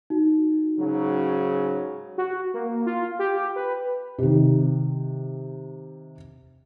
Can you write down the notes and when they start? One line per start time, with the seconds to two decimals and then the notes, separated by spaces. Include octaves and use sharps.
0.10 D#4 F#4
0.79 G#2 C#3 F#3
2.18 F#4
2.54 A#3
2.86 F4
3.19 G4
3.56 B4
4.19 C3 D#3